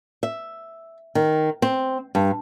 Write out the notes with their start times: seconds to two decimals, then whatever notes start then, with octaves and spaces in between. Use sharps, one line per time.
0.23 E5
1.15 D#3
1.62 C4
2.15 G2